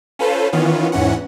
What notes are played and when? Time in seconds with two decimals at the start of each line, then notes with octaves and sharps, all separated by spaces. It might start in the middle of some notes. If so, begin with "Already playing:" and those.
0.19 C#4 F4 A4 B4 C5
0.53 D#3 E3 B3 C#4 F4
0.92 E2 G#2 E3 C#4 F#5